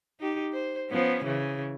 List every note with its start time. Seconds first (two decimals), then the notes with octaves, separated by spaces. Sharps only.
0.20 D#4 G4
0.53 C5
0.89 F3 B3 C#4
1.24 C#3 E3